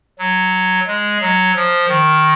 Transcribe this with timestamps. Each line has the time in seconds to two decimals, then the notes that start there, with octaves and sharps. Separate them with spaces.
0.19 F#3
0.87 G#3
1.21 F#3
1.55 F3
1.89 D#3